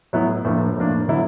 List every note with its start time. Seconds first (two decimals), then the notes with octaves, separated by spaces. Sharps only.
0.13 A2 F#3 B3 E4
0.45 A2 F3 A#3 D4
0.76 A2 F3 A#3 D4
1.08 D3 F#3 B3 E4